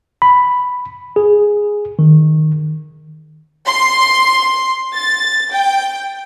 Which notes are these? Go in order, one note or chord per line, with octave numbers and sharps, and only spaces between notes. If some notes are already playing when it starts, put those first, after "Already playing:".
B5
G#4
D#3
C6
A6
G5